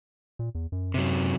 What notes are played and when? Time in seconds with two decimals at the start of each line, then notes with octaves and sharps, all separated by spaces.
0.39 A#2
0.55 E2
0.72 F#2
0.94 C3 F#3